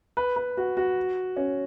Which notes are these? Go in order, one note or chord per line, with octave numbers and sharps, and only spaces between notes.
B4
B4
F#4
F#4
C#4